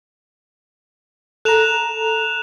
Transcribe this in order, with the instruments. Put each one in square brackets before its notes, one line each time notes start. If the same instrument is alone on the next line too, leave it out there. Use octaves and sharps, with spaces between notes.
[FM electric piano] A4 A#5 [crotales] F#6 E7 F7